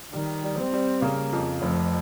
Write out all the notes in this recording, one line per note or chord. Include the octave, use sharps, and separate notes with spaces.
D#3 G3
G3
C4
G3
C#3 A#3
F2
F1 F3